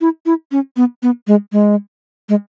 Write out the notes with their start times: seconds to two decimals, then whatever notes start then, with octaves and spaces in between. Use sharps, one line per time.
0.01 E4
0.26 E4
0.52 C#4
0.77 B3
1.03 B3
1.27 G#3
1.52 G#3
2.29 G#3